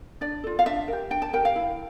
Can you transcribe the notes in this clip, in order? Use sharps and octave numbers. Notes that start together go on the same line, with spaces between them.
D4 D5
F4 A4
F5
D4 E5
G4 A#4
D4 G5
A5
G4 A#4 G5
F5
E4